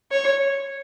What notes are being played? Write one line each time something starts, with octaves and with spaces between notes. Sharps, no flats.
C#5